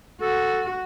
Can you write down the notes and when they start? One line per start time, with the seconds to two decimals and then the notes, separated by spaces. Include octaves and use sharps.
0.21 F#4 A4